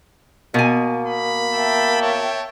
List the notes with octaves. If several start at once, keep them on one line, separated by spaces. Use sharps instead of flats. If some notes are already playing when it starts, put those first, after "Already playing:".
B2 A#3 G#5
B5
E5 G5 A5
C#5